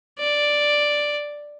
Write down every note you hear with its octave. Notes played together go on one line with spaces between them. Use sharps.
D5